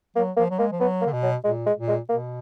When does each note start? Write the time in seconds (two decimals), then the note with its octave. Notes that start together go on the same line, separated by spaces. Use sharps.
0.16 F#3 A#3
0.37 F3 A#3
0.51 F#3
0.59 G#3 A#3
0.72 F3
0.80 F#3 B3
1.02 A#3
1.06 D3
1.13 B2
1.23 F#3
1.44 A#2 G#3
1.66 G#3
1.77 A#2
1.88 G#3
2.09 B2 A#3